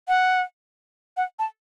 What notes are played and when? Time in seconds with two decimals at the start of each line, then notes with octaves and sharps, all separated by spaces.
0.08 F#5
1.17 F#5
1.39 A5